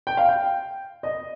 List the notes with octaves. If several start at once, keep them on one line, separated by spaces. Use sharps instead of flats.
G5
F5
G5
D#5